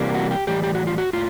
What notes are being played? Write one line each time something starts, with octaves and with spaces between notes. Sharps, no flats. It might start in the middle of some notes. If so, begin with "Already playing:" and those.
Already playing: C3 E3 G3 A#3
F#4
G4
A2 E3 G3 G4
G4
F#4
F4
F#4
A2 F4